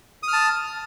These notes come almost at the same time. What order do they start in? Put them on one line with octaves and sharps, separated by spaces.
D#6 F6 A5